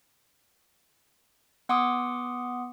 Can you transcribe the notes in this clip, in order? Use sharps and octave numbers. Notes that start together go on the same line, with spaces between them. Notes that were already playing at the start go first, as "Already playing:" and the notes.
B3 F#5 C6 D6 D#6